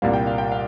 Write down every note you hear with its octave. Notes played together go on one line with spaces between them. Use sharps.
C2 A#2 G3 A#3 F5
G5
F5
G5
F5